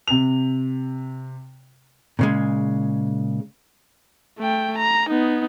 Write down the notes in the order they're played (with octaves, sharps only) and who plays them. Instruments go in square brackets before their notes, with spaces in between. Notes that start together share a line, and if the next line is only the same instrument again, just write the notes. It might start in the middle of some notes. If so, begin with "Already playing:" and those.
[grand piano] C3 F7
[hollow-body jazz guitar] A#2 C#3 G#3
[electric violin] A3 G5
A#5
B3 D#4